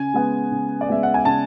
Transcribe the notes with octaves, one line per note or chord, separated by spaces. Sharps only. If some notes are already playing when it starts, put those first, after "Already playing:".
Already playing: C#3 G#5
G#3 B3
C#3
D5
G#3 B3 E5
F#5
G#5
C#3 A5